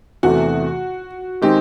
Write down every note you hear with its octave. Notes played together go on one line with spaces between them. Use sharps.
E2 C3 E3 A3 F#4
D#3 G#3 C4 D#4 G4